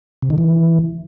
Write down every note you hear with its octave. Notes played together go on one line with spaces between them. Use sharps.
C3
D#3
E3